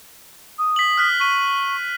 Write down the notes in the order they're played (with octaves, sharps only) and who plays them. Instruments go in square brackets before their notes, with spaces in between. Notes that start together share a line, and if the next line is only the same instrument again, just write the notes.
[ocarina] D#6
[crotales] B6 F#7
F6 F#6 B6
[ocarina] C#6 [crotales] B6 D#7